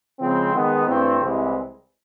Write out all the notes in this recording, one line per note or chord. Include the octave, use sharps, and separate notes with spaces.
C#3 F3 G#3 C4
D#3 G#3 B3
G2 E3 A3 C4
C2 C3 E3 G#3